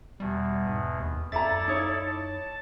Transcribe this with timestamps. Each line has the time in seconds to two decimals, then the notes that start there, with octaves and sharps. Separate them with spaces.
0.20 E2 B2 G3
0.66 G#2
1.00 D#2
1.32 F#2 E4 A4 D5 E5 A#5 A6
1.68 D#4 C#5
2.07 A5